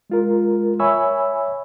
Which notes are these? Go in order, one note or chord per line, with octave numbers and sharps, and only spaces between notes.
G#3 F4 A#4
C#5 E5 G#5 B5 C#6 E6